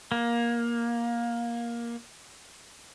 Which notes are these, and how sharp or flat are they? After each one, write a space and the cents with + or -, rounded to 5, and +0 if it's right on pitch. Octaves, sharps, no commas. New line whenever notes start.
A#3 +15